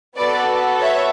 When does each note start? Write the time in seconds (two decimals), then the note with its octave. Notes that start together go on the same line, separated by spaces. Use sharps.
0.18 B3 F#4 A4 B4 D5
0.81 C#5 E5